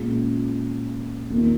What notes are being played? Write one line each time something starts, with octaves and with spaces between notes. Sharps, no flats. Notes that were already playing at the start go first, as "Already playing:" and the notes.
Already playing: A#2 G#3 C#4 F4
D#2 D#3 A#3 F4